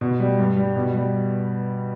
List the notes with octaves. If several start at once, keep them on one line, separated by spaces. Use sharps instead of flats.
B2
G3
G2
G3
B2
G3